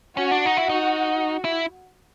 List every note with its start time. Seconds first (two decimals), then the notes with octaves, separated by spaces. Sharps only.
0.17 C#4 F#4
0.31 D4
0.46 D#4
0.57 E4
0.69 D#4
1.44 E4